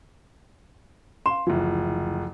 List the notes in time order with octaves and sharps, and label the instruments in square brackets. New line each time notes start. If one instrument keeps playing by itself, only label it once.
[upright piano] F5 C6 [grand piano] E7
[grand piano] F#1 D2 E3 [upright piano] F3